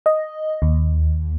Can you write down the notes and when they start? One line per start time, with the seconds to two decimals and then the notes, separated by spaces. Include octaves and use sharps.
0.06 D#5
0.62 D#2